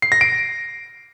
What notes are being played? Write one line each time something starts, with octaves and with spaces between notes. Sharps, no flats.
C7
A#6
D7